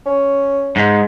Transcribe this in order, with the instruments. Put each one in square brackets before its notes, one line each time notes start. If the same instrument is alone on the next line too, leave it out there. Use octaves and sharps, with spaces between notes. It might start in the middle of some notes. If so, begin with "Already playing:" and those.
[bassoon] C#4
[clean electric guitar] G#2